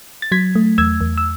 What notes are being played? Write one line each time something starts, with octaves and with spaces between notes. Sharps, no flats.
A6
F#3 G#6 B6
A3
E2 E6 G#6
E2
E6